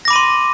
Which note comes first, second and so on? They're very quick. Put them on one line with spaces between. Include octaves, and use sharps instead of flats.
A#6 D6 B5 D#7 C6